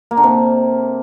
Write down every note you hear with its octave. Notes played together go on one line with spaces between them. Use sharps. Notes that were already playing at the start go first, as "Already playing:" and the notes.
A#3
D3
C3